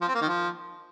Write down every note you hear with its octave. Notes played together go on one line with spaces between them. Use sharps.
F3
C4
A#3
D#3
F3